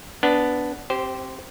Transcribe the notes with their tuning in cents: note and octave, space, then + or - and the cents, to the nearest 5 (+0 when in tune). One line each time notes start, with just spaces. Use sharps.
B3 +0 D4 -10
C4 +20 G4 -15 C5 -10